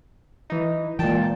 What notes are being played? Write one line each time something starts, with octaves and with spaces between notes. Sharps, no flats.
E3 D#4
A#2 E3 G#3 G5 A5